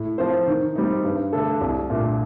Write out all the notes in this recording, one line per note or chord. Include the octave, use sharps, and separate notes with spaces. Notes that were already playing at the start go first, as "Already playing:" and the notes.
Already playing: A2
F3 C4 F4 C5
D#3
G3 C4 D#4
G2
D3 A3 D4 A4
C2
A#2 A3 D4